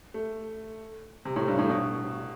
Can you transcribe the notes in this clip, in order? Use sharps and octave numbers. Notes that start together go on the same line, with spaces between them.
A3
C3
A2
G2
A2
B2